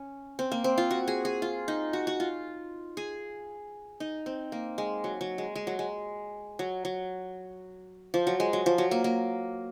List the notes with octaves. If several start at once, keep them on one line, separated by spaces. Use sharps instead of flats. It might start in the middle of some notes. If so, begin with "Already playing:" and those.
Already playing: C#4
C4
A#3
C4
F4
F#4
G#4
G#4
F4
D#4
F#4
F#4
F4
G#4
D#4
C4
A#3
G#3
F#3
F#3
G#3
G#3
F#3
G#3
F#3
F#3
F3
F#3
G#3
F#3
F3
F#3
A#3
A#3